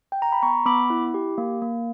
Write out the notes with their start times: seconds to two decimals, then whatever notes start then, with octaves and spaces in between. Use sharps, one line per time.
0.12 G5
0.22 A#5
0.32 B5
0.42 B3 A#5 C#6
0.66 B3 B5 D6
0.90 E4
1.14 G4
1.38 A#3
1.62 A#3